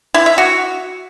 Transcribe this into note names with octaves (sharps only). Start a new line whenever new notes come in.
E4
E5
F#4